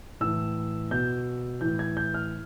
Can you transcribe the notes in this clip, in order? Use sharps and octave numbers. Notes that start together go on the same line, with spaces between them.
A2 E3 E6
B2 G6
A2 E3 G6
G#6
G6
F6